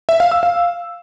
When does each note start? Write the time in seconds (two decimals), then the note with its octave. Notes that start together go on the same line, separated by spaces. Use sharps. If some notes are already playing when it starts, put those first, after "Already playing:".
0.09 E5
0.20 F5
0.31 E6
0.43 F5